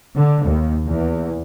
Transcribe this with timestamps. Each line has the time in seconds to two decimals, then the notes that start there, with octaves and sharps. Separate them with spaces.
0.17 D3
0.46 D#2
0.86 E2